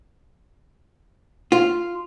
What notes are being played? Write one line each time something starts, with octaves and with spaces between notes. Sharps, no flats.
F4